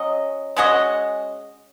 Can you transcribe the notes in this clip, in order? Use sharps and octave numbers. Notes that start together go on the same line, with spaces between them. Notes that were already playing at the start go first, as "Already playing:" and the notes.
Already playing: F#3 C#4 D#5
G#3 C#4 F#4 D#5